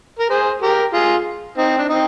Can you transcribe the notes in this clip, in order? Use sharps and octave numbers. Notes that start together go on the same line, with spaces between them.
A#4
G#4 C5
G4 A#4
F4 G#4
C4 D#4
D4
C4 D#4